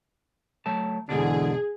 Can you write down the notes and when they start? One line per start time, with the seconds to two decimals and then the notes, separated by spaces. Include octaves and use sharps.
0.66 F#3 A3 A5
1.09 E2 G#2 B2 D3 D4 G#4